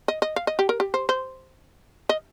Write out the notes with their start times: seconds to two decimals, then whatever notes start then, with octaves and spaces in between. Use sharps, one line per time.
0.08 D#5
0.22 D#5
0.36 F5
0.47 D#5
0.59 G4
0.69 A#4
0.80 G4
0.94 C5
1.09 C5
2.09 D#5